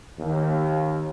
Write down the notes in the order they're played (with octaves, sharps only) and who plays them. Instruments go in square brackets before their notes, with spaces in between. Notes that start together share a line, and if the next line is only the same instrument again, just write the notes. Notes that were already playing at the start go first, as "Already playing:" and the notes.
[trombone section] D#2